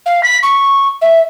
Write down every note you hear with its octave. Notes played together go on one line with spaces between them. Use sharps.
F5
B6
C#6
E5